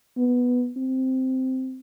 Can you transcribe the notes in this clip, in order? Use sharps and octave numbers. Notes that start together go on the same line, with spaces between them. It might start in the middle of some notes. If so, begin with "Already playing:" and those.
B3
C4